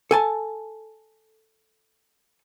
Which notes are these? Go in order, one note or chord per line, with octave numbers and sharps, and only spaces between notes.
A4 G#5 A5